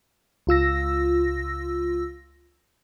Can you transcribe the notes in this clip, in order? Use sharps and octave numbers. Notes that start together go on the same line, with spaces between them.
C#2 F4 E6 A#6